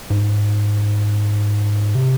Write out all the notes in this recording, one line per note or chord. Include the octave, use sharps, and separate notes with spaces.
G#2
C3